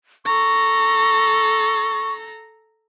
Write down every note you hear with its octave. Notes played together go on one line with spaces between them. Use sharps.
A4 A#5 C#6